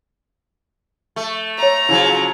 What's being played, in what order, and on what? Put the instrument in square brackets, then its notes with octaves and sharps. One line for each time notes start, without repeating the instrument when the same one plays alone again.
[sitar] A3 [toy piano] C#6
[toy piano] A4 C#5 [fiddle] A#5
[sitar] C#3 F3 F#3 [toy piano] E4